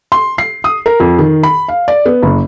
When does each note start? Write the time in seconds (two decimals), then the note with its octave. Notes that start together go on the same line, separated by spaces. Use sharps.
0.12 C6
0.38 C7
0.64 D#6
0.86 A#4
1.00 F2
1.19 D#3
1.43 B5
1.68 F5
1.88 D5
2.06 B3
2.22 F#1